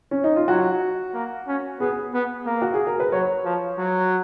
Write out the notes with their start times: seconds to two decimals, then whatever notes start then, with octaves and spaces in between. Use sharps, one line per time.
0.11 C#4
0.24 D#4
0.36 F4
0.48 F#3 F#4
1.14 A#3
1.47 C#4
1.80 B3 G#4
2.14 B3
2.46 A#3
2.62 F#4
2.74 G#4
2.87 A#4
3.00 B4
3.12 F#3 C#5
3.45 F3
3.78 F#3